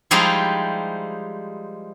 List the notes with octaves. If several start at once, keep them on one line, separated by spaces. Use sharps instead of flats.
F3 G3 G#3 D#4 E4 G4